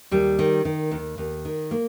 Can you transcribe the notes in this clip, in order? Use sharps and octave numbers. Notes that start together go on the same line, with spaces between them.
D#2 G3
D#3
D#3
D#2
D#2
D#3
A#3